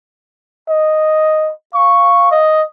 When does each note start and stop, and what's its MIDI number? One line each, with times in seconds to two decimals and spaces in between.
0.69 1.52 75
1.74 2.40 77
1.74 2.31 85
2.31 2.63 75